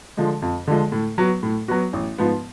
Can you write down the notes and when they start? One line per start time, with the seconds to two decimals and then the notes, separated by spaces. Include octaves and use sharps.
0.17 D3 F3 G#3
0.42 F2
0.67 D3 F3 G#3
0.92 A2
1.18 F#3 B3 F#4
1.43 A2
1.68 F#3 B3 F#4
1.93 A1
2.18 G#2 F3 B3